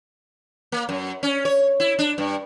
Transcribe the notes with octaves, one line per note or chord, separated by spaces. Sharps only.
A#3
F#2
C#4
C#5
E4
D4
G2